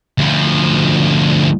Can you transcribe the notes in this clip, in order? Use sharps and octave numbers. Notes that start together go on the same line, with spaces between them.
D2 F3